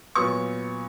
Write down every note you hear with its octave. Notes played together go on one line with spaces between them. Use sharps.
A#2 F#3 B3 C#6